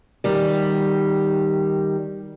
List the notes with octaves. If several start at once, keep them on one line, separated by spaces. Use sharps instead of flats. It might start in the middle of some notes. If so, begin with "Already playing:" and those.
D#3 G3